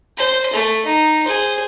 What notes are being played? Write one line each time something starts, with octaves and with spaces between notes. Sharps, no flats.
C5 C6
A3
D#4
G#4 C5